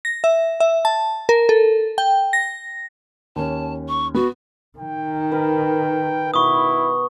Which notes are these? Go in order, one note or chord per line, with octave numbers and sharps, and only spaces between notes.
A#6
E5
E5
A5
A#4
A4
G5
A#6
D#2 C#4 A5
C#6
B3 F#4
D#3 G5
A#4 B4
B2 E4 B5 C#6 D#6